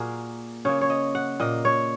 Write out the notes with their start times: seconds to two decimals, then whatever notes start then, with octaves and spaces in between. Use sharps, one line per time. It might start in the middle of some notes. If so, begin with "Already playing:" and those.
Already playing: A#2 A#3 F#4 G#4 A#4
0.65 C#3 A#3 C#5
0.81 C#5
0.90 D#5
1.15 F#5
1.40 A#2 A#3 D#5
1.65 C#5